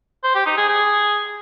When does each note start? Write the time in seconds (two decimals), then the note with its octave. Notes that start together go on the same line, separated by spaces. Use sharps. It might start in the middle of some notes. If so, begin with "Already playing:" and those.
0.24 C5
0.35 G4
0.46 D#4
0.57 G#4
0.69 G#4